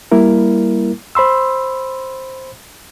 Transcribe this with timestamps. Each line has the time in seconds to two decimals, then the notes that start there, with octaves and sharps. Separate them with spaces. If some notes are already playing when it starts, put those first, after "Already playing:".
0.12 G3 A#3 E4 A#4
1.15 C5 B5 C6 E6